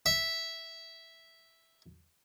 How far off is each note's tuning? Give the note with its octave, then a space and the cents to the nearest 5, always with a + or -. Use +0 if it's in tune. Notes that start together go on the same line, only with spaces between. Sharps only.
E5 -5